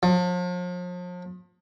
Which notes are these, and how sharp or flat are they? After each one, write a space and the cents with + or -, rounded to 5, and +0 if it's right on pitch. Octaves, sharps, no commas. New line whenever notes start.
F3 +40